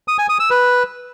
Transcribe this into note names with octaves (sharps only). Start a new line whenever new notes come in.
D#6
G#5
D#6
E6
B4